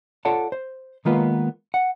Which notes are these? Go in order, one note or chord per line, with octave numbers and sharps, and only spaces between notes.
F4 A4 C#5 D5 F#5 A5
C5
D#3 G#3 A#3 B3 F4 B4
F#5